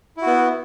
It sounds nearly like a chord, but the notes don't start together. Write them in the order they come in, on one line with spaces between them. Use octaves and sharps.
E4 F#4 B3